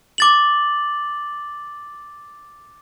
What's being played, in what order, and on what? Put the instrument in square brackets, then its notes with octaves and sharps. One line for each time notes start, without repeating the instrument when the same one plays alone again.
[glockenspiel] D6 A6 F#7